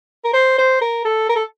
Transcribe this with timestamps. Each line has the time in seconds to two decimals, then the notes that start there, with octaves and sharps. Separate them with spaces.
0.25 A#4
0.34 C5
0.58 C5
0.82 A#4
1.05 A4
1.29 A#4
1.36 A4